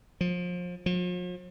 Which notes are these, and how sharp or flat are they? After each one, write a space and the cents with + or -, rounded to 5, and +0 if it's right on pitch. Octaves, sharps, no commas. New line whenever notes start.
F3 +30
F3 +45